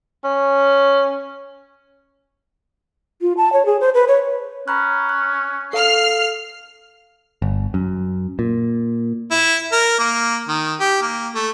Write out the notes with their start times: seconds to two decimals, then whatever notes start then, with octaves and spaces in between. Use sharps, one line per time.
0.24 C#4
3.21 F4
3.37 A5
3.53 C#5
3.66 G#4
3.81 C5
3.94 B4
4.08 C#5
4.68 C#4 A#5 B5 F#6
5.09 F#6
5.73 A4 F5 F6 C7
7.42 G1
7.74 F#2
8.39 A#2
9.31 E4
9.72 A#4
9.99 A#3
10.48 D#3
10.80 G4
11.02 A#3
11.35 A3